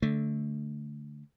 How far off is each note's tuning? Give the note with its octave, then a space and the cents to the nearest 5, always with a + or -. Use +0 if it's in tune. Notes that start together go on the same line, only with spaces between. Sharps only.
D3 -15 A3 -5